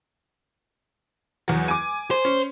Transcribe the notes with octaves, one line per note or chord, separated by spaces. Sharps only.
E2 F#3
G#5 D6
C5
C#4